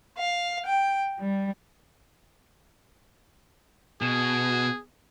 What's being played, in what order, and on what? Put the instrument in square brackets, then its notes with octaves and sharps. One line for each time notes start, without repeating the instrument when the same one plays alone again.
[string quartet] F5
G5
G3
[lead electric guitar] B2 [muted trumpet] G#4